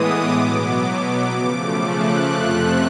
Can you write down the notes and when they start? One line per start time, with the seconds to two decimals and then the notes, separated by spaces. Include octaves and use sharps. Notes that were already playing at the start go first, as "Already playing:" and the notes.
Already playing: A2 E3 G#3 B3 D6 D#6
0.32 B2 F#3 B3
0.82 D6
1.32 C#3 F3 A3
1.81 F#6
2.30 F2 C3 F3 A3